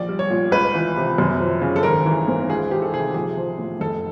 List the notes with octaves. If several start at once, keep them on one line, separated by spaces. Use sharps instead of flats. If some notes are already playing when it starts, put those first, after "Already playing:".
Already playing: A#1 D5
G3
C#5
A#2
C#2 B4
E3
C3
F#2
F3
C#3
A4
G#1 A#4
E3
G#2
C#2 G#4
E3 G4
A4
C3 G#4
A#1 G#4
F3
A2
F1 A4